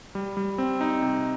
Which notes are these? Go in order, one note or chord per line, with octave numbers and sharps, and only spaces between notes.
G3
G3
C4
D#4
C3